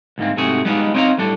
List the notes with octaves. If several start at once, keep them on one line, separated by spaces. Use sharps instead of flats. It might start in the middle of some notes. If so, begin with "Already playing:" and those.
D2 G#2 A#3 C4
G#2 C3 A3 F#4 G#4
G3 G#3 B3 D4 D#4 F4
C4 D#4 C#5 E5 F5 A#5
A2 G3 D4 A4